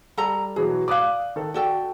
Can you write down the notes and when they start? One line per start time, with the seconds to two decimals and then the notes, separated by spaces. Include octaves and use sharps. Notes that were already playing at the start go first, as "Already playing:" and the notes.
0.17 G3 A4 A#5
0.56 B2 E3 F#3 G#4
0.88 D5 F5 D6 D#6 F#6
1.36 D#3 A4
1.54 F#4 A4 D5 G5